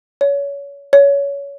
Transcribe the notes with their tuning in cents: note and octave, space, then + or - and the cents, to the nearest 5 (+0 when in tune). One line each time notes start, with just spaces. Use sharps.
C#5 +25
C#5 +20